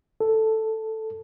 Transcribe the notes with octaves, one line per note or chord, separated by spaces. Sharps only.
A4